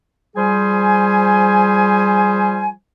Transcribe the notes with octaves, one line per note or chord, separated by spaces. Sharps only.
F3 G3 G#4 C5 G#5